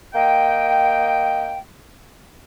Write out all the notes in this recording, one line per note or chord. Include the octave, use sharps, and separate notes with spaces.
A#3 D#5 G5